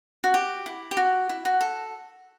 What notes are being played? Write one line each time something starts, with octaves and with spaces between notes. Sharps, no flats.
F#4
G4
E4
G4
F#4
E4
F#4
A4